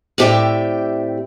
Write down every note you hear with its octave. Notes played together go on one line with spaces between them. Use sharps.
A2 C4 G4 D5 E5 G5